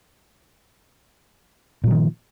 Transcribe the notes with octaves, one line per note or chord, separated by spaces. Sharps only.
A#2 D#3 F3 F#3